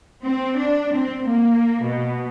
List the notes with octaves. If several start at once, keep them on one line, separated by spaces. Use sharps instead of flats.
C4
D4
C4
A#3
B2